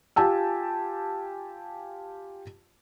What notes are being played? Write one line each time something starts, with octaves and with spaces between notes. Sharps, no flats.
F4 G4 G#5 A5 E6